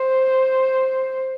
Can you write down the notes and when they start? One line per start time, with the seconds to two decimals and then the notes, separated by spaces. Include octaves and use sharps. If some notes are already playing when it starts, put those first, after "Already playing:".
Already playing: C5